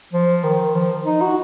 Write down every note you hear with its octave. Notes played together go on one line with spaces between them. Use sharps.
F3
D#3
F3
D#4
F#4